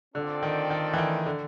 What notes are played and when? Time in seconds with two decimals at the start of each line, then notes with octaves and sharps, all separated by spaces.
0.14 D3 C4 F4 A4 D5 G5
0.43 D#3
0.70 D#3
0.93 E3
0.98 D#3
1.26 D3